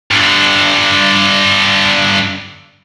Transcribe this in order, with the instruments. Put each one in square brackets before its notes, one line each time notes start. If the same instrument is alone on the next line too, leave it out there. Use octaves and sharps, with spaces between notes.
[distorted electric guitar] G2 D3